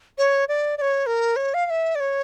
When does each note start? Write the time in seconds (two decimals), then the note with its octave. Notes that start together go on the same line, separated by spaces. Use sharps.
0.18 C#5
0.48 D5
0.78 D5
0.81 C#5
1.06 A#4
1.36 C#5
1.54 F5
1.66 F5
1.70 E5
1.95 D5
2.00 C#5